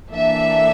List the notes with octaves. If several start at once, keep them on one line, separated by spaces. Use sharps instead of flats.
E3 A#3 D4 A4 E5